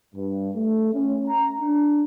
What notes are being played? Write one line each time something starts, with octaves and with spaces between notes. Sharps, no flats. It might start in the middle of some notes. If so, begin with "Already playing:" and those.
G2
A3
C#4
A#5
D4